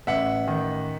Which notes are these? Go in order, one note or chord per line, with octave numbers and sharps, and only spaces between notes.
A1 E5 F#5
D#3